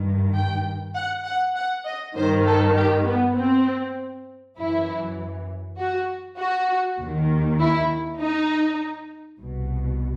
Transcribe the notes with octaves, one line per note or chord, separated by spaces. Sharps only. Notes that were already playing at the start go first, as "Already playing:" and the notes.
Already playing: G2 D#3
G5
F#5
F#5
F#5
D#5
G2 D#3 C5
A4
G4
B3
C4
F#2 E3 E4
F#4
F#4
D#2 D#3
E4
D#4
C2 B2